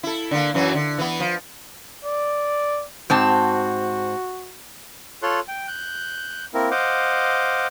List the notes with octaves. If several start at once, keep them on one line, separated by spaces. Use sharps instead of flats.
E4 A4
D3 A#3
F#2 E3 F#3
D3
E3 B3
F3
D5
G#2 C4 F#4 A5
F4 A4 C#5 C6 F#6
G5
F#6 G6
A#3 C4 E4 A#4
C5 D#5 F5 F#5 D6